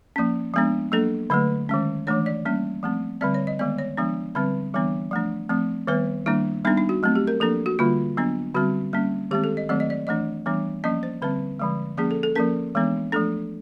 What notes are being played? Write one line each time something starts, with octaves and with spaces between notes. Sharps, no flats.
F3 A#3 C#4
F3 G#3 B3 D4
F#3 A#3 D4 A4
D3 F#3 A3 B4
D#3 G#3 C#4
E3 A3 D4 C#5
D5
G3 A#3 C#4
F3 A3 C4
D3 G3 C4 D5
C#5
D#5
D#3 G#3 B3 D5
C#5
F3 G#3 B3 D4
D3 G3 C4 B4
E3 G3 B3 D4
F3 A3 D4
F3 A3 C4
D#3 G3 B3 B4
D#3 G3 A#3 D4 E4
G3 B3 D4 D#4
D#4
F#4
F#3 A3 C4
G4
A#4
F3 A#3 D4 A4
F#4
D3 G3 A#3 F4
F#3 B3 D4
D3 G3 C4 F#4
G3 A#3 C#4
D#3 G#3 C4 G4
A4
D#5
D#3 F#3 A3 C4 D5
D#5
D5
E3 A3 D4 D#5
E3 G3 B3 D4
F3 A#3 C#4 D#5
C5
D3 G3 C4 B4
D3 F3 G#3
F3 A#3 C#4 G#4
A4
A4
F3 A#3 C#4 A#4
E3 G#3 B3 D4
F3 A3 D4 A4